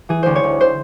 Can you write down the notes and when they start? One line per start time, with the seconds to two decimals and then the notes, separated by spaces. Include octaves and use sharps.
0.09 E3 G#4
0.23 D2 C5
0.35 C#5
0.44 D2
0.61 C5